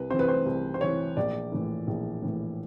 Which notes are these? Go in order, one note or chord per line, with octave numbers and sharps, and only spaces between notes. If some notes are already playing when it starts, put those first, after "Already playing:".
Already playing: C2 B4
C3 E3 C5
B4
C5
C2
C5
C3 E3 C#5
A#1 D5
A2 E3
A#1
A2 E3